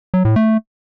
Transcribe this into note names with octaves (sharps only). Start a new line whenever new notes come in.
F#3
A2
A3